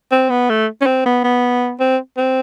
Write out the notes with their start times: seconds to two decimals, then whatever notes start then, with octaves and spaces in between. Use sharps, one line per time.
0.12 C4
0.30 B3
0.50 A3
0.81 C#4
0.86 C4
1.06 B3
1.24 B3
1.80 C4
2.17 C4